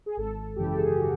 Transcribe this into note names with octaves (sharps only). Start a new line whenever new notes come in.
G#4
G#1 A4
F#2 C#3 E3 G4
A4
G#4
G4
F#4